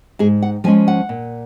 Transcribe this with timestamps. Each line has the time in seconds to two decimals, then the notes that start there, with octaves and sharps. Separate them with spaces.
0.19 G#2 G#4
0.42 F#5
0.64 F3 G#3 C#4 G#5
0.88 F#5
1.09 A#2